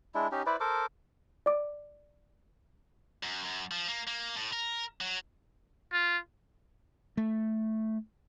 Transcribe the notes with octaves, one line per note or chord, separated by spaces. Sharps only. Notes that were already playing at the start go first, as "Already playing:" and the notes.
G#3 D4 E4
C#4 D#4 G4
E4 B4 C5 D5
A4 A#4 C5 D6
D5 D6
F#2
F#2
F3
A#3
A#3
A2
A#4
F#3
F4
A3